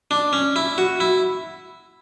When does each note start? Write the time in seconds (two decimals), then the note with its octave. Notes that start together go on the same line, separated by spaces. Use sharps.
0.11 D4
0.33 C#4
0.56 E4
0.78 F#4
1.00 E4